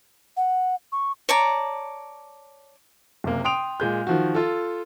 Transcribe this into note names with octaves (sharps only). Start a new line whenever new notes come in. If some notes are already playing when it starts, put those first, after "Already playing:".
F#5
C#6
C#5 D5 A5 A#5
F#1 C3 A#3
G5 C6 D#6 D7 F7
A#2 G#3 G6
D#3 F3 F#4
F4 A4